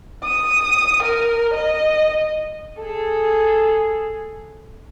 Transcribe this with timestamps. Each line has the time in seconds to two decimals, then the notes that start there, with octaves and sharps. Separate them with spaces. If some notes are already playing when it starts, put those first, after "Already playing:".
0.24 D#6
1.03 A#4
1.54 D#5
2.79 G#4 A4